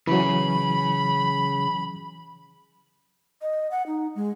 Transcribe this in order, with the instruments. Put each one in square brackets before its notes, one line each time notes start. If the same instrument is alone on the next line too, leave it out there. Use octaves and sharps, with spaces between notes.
[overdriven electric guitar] C#3 [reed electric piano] E3 F#3 [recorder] B5
[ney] D#5
F#5
D#4
G#3